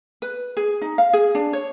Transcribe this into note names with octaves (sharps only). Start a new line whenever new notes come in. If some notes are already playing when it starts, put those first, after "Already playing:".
B4
G#4
D#4
F5
G#4
D4
C#5